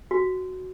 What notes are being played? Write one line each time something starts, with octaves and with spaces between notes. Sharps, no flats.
F#4